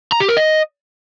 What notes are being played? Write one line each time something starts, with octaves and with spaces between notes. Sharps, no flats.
A#5
G4
A#4
D#5